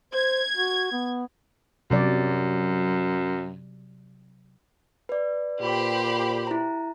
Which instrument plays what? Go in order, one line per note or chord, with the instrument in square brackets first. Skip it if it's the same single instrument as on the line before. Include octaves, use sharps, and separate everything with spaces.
[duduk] C5 [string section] G#6
[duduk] F#4
B3
[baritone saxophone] F#2 [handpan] C3 F#3 D5
[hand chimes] B4 D5
[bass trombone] A#2 [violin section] G4 C5 B5
[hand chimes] E4 A#5